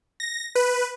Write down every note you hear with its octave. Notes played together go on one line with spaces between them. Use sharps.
A#6
B4